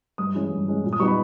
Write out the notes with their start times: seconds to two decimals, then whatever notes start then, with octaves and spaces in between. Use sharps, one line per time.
0.18 G2 D#6
0.35 E3 G#3 C#4
0.51 G2
0.68 E3 G#3 C#4
0.84 A#2
0.93 D#6
1.00 G3 B3 D#4 C#6
1.08 B5